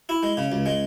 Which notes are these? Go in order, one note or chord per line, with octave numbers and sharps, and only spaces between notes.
E4
G#3
C#3
C#2
G#3